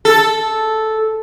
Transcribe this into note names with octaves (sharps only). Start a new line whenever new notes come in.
A4